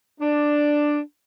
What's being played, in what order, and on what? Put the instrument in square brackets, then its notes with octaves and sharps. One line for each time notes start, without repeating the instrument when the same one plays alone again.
[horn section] D4